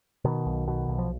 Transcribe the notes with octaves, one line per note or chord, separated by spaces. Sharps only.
B2 D#3
B1
B2
B1
F3